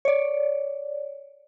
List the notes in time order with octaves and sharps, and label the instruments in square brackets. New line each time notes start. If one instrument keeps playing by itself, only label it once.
[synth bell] C#5 D5